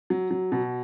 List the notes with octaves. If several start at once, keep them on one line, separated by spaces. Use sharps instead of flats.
F#3
F#3
B2